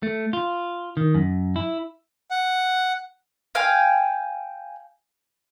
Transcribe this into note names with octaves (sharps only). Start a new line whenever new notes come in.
A3
F4
D#3
F#2
E4
F#5
F5 G5 G#5